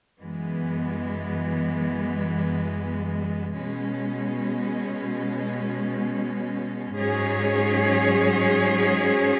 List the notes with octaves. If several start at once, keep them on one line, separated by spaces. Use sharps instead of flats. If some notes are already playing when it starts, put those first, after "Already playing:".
F#2 E3 G#3 B3
B2 G#3 C#4
G#2 F#3 C#4 G#4 C#5